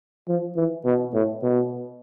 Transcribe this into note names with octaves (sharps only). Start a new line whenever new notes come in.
F3
E3
B2
A2
B2